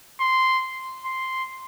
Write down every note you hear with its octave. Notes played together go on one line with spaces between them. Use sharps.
C6
C6